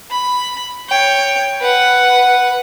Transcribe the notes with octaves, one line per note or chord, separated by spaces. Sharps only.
B5
C#5 G5
B4 F#5